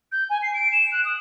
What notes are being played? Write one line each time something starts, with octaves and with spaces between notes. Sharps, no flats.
G6
G#5
C7
D7
E7
F#6
D#6